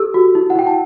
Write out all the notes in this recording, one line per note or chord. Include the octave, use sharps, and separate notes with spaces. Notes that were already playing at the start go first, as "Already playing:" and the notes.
Already playing: G4 A4 E6
F#4
E4
F#5
E4 G5
A5